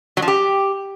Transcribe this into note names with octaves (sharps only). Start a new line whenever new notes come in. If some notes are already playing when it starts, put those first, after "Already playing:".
F#3
F3
G4